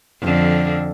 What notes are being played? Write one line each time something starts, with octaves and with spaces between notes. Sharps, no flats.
F2 D3